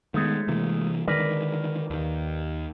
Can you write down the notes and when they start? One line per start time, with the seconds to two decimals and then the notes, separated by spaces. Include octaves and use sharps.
0.14 D#3 G#3 A3 B3
0.48 C3 E3 A#3
1.08 D3 D#3 G#3 A#4 B4 D5
1.90 D#2 D#3